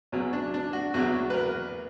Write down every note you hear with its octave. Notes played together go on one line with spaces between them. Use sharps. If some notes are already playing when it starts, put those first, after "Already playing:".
E2 B2 F#3 C#4
D4
D4
F#4
E2 B2 F#3 F#4
B4
A#4